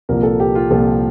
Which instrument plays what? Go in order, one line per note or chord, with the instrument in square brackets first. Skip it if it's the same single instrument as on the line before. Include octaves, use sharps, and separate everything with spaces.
[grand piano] C2 A#2 F3 A#4
A4
G4
F4
C2 A#2 F3 A4